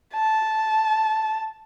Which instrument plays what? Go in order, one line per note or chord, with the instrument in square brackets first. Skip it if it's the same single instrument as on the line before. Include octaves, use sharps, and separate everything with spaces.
[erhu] A5